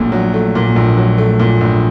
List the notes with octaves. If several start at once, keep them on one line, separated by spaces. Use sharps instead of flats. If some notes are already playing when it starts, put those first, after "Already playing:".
Already playing: A#1 A#2 F#3 A3 A#3
F#3
A3
A#2
A#1
F#3
A3
A#2
A#1